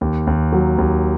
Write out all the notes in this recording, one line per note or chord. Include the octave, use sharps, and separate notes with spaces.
D#2
D#2
F#3
D#2